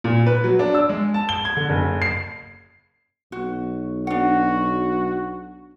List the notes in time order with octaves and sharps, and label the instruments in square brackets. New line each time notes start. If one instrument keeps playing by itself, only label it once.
[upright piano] A#2
B4
F#3
D4
E6
G#3
A5
G7
G#6
D3
F#1
C7
[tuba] B1 [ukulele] F#4
[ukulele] D4 F#5 [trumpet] F#4